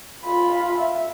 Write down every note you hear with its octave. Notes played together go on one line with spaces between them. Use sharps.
F4 B5
E5